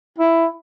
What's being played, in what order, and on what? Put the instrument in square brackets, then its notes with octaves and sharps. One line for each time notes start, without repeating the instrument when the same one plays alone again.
[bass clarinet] E4